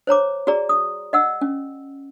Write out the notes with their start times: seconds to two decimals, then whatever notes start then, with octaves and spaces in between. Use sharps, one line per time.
0.07 C5 C#5 A#5 D6
0.47 F#4 G#4 D5 A#5
0.69 D#6
1.13 D#5 F#5 E6
1.41 C#4